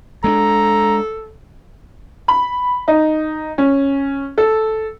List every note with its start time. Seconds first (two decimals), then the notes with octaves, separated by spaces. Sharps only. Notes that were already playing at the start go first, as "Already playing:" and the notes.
0.24 G#3 A#3 D4 A4 A#5
2.28 B5
2.88 D#4
3.58 C#4
4.38 A4